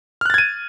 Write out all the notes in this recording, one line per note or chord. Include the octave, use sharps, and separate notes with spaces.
F6 F#6 G#6 A6 D#7